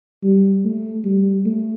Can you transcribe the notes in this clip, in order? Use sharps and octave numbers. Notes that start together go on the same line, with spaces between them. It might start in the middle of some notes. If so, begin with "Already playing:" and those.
G3
A3
G3
A3